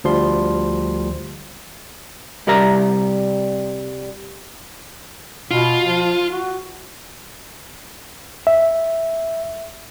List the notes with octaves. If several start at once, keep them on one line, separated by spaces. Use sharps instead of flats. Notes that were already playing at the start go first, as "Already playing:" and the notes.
D2 F3 G3 C6
C2 G3 A#4 E5 A#5
B2 F4
F3
F#4
E5